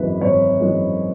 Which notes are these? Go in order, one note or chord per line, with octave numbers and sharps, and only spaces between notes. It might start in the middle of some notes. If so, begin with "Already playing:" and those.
Already playing: G#1 F#2 E3 G#3 B4
G#1 C#5
F#2 E3 G#3